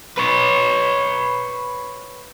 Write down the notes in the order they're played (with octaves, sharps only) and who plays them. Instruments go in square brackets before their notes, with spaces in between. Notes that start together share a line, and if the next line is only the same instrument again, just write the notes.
[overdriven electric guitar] B4 C#5